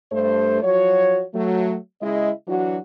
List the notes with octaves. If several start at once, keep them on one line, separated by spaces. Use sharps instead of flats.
G2 A3 C5
F3 F#3 F#4 C#5
F#3 A3
C#3 G#3 E4 D#5
E3 F#3 D4 F#4